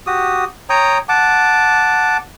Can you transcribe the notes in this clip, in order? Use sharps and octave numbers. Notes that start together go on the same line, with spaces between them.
F#4 G4 D#6
C#5 G5 A#5 D#6
F#5 A5 D6